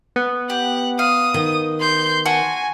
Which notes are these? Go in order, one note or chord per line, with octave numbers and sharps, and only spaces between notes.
B3
G4 F#5
F5 D#6
D#3
C6 G6
F#4 G#5 A5